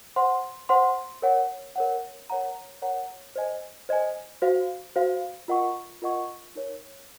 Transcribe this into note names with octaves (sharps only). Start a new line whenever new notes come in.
C5 F#5 C6
C5 F#5 C6
A#4 C#5 F#5
A#4 C#5 F#5
A#4 C#5 F#5 A#5
A#4 C#5 F#5 A#5
C5 D#5 G#5
C5 D#5 G#5
F#4 C5 F5
F#4 C5 F5
F4 A#4 D#5 F#5 C#6
F4 A#4 D#5 F#5 C#6
D#4 A#4 C#5